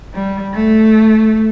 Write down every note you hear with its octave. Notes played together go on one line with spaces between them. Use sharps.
G3
A3